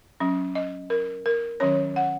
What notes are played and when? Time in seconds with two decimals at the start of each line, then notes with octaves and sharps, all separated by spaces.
0.20 F#3 C#4
0.55 D#5
0.90 A#4
1.26 A#4
1.60 D#3 F#3 C#4 C#5
1.96 F#5